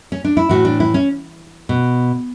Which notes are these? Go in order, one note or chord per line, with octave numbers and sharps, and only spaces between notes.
C#4
D4
E4
A2 E3 F#4
D4
E4
C#4
B2